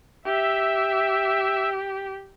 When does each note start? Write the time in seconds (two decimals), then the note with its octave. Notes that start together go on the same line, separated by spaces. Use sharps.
0.25 G4 E5